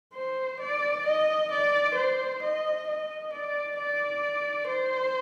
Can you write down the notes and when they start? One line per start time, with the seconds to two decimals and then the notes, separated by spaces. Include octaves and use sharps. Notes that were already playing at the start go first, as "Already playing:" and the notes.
0.14 C5
0.60 D5
1.06 D#5
1.51 D5
1.96 C5
2.42 D#5
2.87 D#5
3.33 D5
3.78 D5
4.69 C5